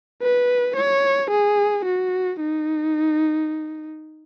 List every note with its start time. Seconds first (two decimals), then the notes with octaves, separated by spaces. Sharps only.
0.22 B4
0.77 C#5
1.31 G#4
1.85 F#4
2.40 D#4